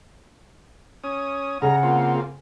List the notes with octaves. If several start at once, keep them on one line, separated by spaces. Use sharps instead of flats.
C#4 D#6
C#3 F#5 A#5
A#3 C4 F4